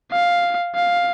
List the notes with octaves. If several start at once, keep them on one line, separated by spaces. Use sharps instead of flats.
F5
F5